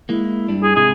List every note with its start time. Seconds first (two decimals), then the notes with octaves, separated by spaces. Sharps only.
0.09 G#3 A#3 E4
0.48 G2 G3 D4
0.63 G#4
0.76 G#2 C3 E4 G#4